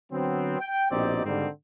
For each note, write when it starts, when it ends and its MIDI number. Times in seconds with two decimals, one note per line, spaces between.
0.12 0.57 50
0.12 0.57 54
0.12 0.57 59
0.12 0.57 60
0.60 0.89 79
0.91 1.22 34
0.91 1.22 47
0.91 1.22 60
0.91 1.22 63
0.91 1.22 67
0.91 1.22 74
1.25 1.48 44
1.25 1.48 50
1.25 1.48 51
1.25 1.48 55
1.25 1.48 58
1.25 1.48 60